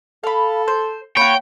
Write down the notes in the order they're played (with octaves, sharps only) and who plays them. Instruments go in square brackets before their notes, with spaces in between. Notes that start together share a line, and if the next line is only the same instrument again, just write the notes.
[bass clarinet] A4 [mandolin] F5 B5
[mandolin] C5
[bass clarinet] A#3 [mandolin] F#4 B5 [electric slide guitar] C#5 [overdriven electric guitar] G5